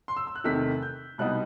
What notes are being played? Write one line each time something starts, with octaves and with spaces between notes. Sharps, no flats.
C6
E6
E6
F#6
E2 C3 D#3 A3 B6
G6
C2 B2 G3 B3 D#4 F#6